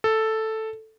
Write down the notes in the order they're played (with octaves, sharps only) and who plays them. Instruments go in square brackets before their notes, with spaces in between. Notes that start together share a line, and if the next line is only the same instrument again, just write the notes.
[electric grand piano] A4